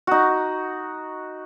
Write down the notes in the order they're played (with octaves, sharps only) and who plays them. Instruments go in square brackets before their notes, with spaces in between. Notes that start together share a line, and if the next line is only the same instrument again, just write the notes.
[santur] D#4 F#4